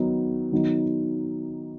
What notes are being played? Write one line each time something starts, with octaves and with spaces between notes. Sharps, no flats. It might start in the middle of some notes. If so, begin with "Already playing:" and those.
Already playing: D#3 F#3 B3 D#4
D#3 F#3 B3 D#4